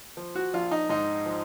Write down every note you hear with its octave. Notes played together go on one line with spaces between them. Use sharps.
F3
F#4
A#1 F4
D#4
G#2 D#4
F3